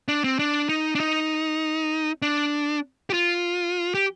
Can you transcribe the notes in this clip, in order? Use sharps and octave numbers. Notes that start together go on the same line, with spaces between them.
D4
C4
D4
D#4
D4
D#4
D4
G4
F4
G4